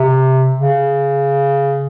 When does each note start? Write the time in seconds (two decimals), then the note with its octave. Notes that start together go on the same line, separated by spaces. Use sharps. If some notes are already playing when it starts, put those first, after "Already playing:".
Already playing: C3
0.56 C#3